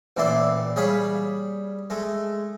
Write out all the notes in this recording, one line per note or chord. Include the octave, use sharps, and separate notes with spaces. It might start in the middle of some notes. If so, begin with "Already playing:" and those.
A1 A#2 E3 E4 D5 C6
G3 G#4 C#5 F5 B5
G#3 A3